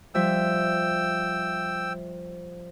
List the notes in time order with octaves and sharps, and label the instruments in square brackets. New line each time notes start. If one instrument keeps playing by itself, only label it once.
[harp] F3 G3 E5 [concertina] G5 E6